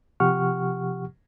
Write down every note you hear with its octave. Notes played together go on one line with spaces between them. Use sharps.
C3 F3 G4 F#5 C#6 F6